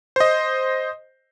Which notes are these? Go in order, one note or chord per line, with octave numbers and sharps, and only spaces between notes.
C5 D#5